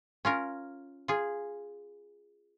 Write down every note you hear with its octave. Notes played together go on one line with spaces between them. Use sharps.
C#4 F4 A#4
F4 G#4